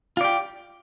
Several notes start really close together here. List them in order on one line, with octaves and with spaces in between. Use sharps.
F4 D5 G4